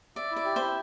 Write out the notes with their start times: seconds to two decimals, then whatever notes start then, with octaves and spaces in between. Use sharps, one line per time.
0.16 D5 E5
0.31 E4
0.36 D5
0.45 G4
0.56 E4 C5 E5